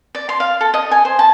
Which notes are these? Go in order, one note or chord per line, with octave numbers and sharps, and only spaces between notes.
D5
C6
F5
A4
D#5
G#5
C5
A5